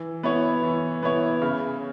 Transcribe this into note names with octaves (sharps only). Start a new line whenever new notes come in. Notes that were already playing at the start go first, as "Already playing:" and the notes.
Already playing: E3
B3 E4 C#5
E3
B3 E4 C#5
C#3